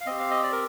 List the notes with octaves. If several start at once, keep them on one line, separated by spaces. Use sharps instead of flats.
F5
C4 G4 D#5
F5
D#5
D5
A#4